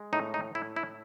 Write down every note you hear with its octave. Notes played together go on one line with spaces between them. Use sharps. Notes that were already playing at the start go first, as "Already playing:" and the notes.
Already playing: G#3
A2 D#4
D#4
A2 E4
E4